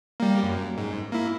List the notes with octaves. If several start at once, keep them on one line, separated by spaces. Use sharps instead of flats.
G3 A#3
F#2
G#2
A#3 E4